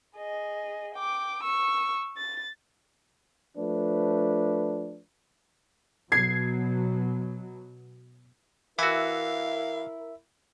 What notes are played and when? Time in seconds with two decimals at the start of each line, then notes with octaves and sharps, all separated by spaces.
0.18 G#4 D#5
0.95 G5 D6
1.43 C#6 E6
2.17 A6
3.57 F3 A3 D4 B4
6.12 B2 F#3 G#6 C7
8.79 E3 E4 F#4 A#4 E5 F5